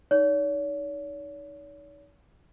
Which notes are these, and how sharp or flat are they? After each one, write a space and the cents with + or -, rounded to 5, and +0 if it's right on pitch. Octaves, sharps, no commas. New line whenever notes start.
D#4 +0 C#5 +45